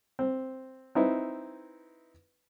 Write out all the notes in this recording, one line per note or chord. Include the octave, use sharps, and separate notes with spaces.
C4
C4 D#4 E4 B4